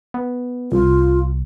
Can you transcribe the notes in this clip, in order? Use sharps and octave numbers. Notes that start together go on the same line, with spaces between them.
B3
C2 F4